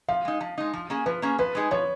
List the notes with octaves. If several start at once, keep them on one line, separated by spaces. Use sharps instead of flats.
F3 F5
G#3 D#4
F3
G#3 D#4
F3
A#3 C#4 G#4
F3 B4
A#3 C#4 G#4
F3 B4
G#3 D#4 G#4
F3 C#5